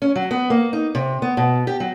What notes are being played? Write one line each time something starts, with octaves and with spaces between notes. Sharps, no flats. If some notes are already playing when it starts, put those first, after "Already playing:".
C#4
F#3
B3
A#3
D#4
C3
B3
B2
G4
F#3